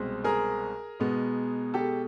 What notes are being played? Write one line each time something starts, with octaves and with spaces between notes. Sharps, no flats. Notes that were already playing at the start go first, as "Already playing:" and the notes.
Already playing: C2 B2 G#3 C4
G#4 A#4
B2 G#3 B3
G4 A4